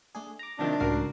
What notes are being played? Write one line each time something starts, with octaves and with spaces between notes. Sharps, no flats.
A3 D4 G#4
A#5 D6
C3 D#3 F3 D4
C#2 A2 F#4 A#4 C7